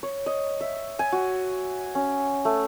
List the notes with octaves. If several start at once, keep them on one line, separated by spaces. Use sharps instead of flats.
C#5
D#5
E5
G#5
F#4
C#4
A3